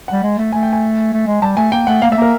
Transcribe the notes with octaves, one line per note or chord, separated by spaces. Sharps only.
G3 F#5
G#3
A3
A3 G#5
G5
G#5
A3
G#3
G3 A5
A3 G#5
A#3 G5
A3 F#5
A#3 F5
A3 E5
A#3 A#4